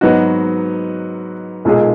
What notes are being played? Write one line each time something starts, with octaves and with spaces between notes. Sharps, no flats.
G#2 F#3 B3 D#4 F#4
B1 A#2 G#3 D#4 G#4